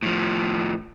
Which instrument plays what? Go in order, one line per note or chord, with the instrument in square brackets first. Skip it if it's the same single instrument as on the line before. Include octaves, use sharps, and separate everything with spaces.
[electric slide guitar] A2 F3